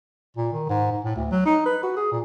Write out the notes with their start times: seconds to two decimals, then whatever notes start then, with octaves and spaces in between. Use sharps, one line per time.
0.37 A#2
0.53 D#3
0.69 G#2
0.91 G#2
1.04 A2
1.16 D2
1.31 F#3
1.46 D#4
1.66 B4
1.83 F#4
1.97 G#4
2.12 A#2